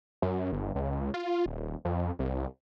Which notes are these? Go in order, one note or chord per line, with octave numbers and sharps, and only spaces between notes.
F#2
G1
C#2
F4
D#1
F2
C2